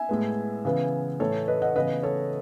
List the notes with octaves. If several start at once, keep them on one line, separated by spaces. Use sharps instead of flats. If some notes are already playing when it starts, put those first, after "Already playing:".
Already playing: E5 G#5
A2 G#3 B3
C#3 E3 B3
A2 E3 A3 A4 C#5
B4 D#5
D#5 F#5
C#3 E3 B3 B4 D#5
A4 C#5